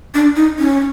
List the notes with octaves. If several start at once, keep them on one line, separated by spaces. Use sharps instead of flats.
D4
D#4
C#4